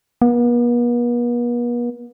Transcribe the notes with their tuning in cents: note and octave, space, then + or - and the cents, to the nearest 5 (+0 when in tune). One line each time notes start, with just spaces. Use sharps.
B3 -45